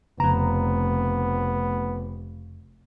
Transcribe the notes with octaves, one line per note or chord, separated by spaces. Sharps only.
F1 F2 C#3 B3 A#5